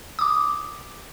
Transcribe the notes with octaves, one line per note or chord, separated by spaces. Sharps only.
D6 D#6